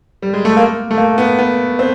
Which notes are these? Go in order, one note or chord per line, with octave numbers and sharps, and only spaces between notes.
G3
G#3
A3
A#3
A3
A#3
B3
B3
C4